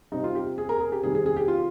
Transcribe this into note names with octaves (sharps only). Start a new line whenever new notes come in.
C3 G3 D#4
F4
G4
G#4
A#4
G#4
G4
C3 D#3 G3 G#4
G#4
G#4
G4
F4